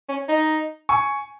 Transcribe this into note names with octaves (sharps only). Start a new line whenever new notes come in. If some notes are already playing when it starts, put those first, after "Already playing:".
C#4
D#4
G#5 C#6